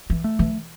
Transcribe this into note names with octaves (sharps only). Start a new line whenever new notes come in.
E3
A3
E3